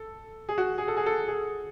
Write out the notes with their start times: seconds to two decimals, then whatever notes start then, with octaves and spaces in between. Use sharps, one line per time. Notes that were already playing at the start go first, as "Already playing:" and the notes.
Already playing: A4
0.49 G#4
0.58 F#4
0.78 G#4
0.88 A4
0.97 G#4
1.06 A4
1.28 G#4